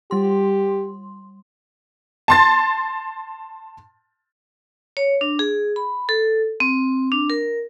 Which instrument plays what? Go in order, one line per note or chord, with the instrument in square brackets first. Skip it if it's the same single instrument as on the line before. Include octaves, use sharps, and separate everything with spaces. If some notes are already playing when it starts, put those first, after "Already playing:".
[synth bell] G3 C6 [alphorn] G4
[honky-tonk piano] A5 C6 A6
[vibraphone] C#5
D4
G#4
B5
A4
C4
D4
A#4